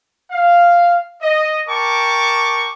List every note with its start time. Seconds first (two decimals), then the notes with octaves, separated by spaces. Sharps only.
0.31 F5
1.21 D#5
1.68 A#4 G5 A5 C#6 D6